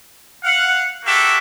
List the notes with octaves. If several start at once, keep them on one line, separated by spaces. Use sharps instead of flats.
F5 F#5
A#3 F#4 G4 A4 E5